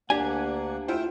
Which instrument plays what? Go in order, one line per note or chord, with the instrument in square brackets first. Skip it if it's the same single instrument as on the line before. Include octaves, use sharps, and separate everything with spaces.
[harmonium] D2 A#3 F#5 [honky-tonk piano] D4 [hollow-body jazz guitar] G4 G#5
[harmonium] A3 G5 [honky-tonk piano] E4 F4 C5